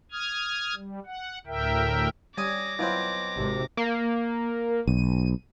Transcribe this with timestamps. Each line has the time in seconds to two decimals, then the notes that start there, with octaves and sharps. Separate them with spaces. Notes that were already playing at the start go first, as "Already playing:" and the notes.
0.12 D#6 F6 G#6
0.75 G3
1.06 F#5
1.47 D2 A2 A#4 E5 G5
2.38 G3 C#4 G#5 D6 D#6 A#6
2.79 B2 F#3 C4 E4 F4
3.35 G#1 C3
3.77 A#3
4.87 B1 D#7